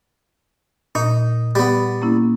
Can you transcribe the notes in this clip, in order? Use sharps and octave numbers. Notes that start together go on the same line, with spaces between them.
A#2 D#4
G3 B3
A#3 C#4 E4